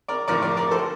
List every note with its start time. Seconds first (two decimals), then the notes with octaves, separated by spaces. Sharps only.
0.08 A#4 D5
0.28 A2 F3 A#4 D5
0.42 A#4 D5
0.57 A#4 D5
0.71 A4 C5